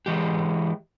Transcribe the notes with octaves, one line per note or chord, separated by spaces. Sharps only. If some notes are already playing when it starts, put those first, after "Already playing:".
E3 G#3 G4